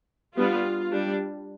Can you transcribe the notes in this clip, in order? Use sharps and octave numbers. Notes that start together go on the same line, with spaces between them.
G3 B3 D4 F4
G3 D4